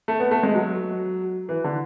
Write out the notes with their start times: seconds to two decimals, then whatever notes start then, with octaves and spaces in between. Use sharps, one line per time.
0.08 A3
0.20 B3
0.31 A3
0.43 G#3
0.55 F#3
1.49 E3
1.64 D3